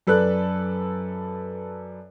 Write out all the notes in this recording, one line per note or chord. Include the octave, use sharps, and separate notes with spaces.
F#2 A4 B4 D5 F#6